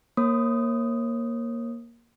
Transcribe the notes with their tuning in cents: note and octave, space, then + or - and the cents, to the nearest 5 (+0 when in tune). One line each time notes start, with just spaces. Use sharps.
A#3 +5 C#5 -30 D#6 +0